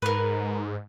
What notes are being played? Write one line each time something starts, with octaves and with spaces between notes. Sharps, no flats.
G#2 A#4 B4